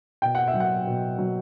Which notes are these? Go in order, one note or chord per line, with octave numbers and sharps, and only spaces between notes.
B2 G5
F#5
E5
F#3
F#5
B2
F#3